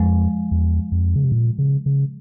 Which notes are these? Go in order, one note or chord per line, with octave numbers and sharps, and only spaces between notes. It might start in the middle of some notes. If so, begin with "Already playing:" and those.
Already playing: F2 F3 G#3
E2
F2
C#3
C3
A#2
C#3
C#3